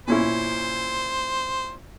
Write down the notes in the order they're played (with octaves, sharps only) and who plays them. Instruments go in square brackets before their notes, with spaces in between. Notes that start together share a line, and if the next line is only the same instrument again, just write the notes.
[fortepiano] A#2 C#4 E4 [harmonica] C5